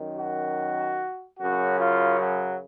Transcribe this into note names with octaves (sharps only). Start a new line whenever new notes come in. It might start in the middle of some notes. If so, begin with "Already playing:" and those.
Already playing: F#2 D#3
F#4
F#2 C#3 F#4
F4
F#3